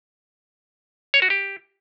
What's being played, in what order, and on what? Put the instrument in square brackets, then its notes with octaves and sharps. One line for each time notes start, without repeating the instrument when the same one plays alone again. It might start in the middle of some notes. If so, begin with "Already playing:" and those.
[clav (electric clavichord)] C#5
F#4
G4